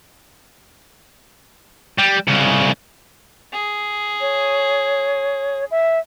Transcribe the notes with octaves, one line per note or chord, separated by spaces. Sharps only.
G3
C2 C#3
G#4
C#5
E5